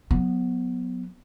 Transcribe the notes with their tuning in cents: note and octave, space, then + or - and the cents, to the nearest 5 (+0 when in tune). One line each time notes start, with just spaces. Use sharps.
F#3 -15 B3 +0